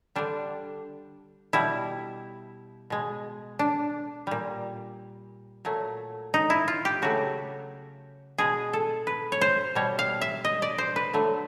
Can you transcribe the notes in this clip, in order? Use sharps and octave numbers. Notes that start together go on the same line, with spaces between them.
D3 G3 D4
B2 G3 E4
B2 G#3
D4
A#2 G3
A#2 F#3 A3
D#4
E4
F4
G4
C#3 F#3 A3 F#4
B2 G#3 G#4
A4
B4
C#5
C5
B2 G3 C#5
F5
E5
D#5
D5
C5
B4
D3 F#3 A3